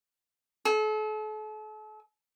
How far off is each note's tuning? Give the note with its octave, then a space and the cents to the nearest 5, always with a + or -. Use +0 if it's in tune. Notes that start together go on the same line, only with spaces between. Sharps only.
A4 -40